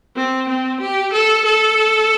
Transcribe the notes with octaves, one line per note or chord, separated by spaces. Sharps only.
C4
C4
G4
A4
A4